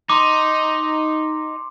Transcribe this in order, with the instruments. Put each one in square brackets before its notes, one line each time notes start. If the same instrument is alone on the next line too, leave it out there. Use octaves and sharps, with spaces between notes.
[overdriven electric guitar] D#4 [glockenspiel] C6 D6